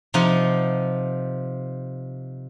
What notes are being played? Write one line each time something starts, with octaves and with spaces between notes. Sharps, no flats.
C3 F3 D#4 F#5